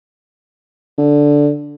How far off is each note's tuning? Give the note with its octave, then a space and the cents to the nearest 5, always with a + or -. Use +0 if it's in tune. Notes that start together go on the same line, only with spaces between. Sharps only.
D3 -5